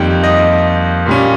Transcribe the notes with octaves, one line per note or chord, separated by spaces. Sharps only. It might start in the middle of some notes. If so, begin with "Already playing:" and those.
Already playing: F2 D#3 G3 A#3 G5
D#5
A#2 G3 C#4